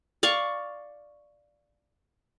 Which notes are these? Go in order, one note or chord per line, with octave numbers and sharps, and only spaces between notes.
D5 F5 C#6